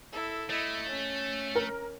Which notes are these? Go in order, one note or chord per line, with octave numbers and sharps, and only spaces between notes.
E4 A4
A3 E4 D#5
C#4
A#4